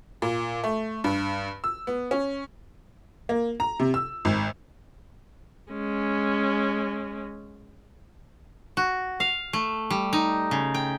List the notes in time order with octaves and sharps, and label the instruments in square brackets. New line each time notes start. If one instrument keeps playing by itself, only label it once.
[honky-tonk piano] A#2
A3
G2
E6
B3
C#4
A#3
A#5
C3
E6
G#1
[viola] G#3 C#4
[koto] F#4
F5
A3
G3
D#4
C#3
G5